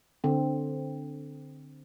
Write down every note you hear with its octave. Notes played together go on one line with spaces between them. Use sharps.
D3 C4